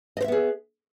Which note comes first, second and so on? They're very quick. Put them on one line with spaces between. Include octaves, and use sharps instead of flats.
D#5 C5 E5 B3 G#4